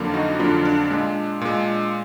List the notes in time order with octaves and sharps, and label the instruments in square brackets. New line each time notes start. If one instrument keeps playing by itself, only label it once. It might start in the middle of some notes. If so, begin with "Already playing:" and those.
Already playing: [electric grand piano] F2 D3 F#3 A#3
D#4 F#4
F2 D3 F#3 A#3 D4 F4
D4
A#2 G#3 D4
A#2 G#3